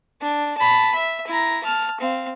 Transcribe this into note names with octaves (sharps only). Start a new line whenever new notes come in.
D4
A5 B5
E5
E4 A#5
A5 F6
C4 F5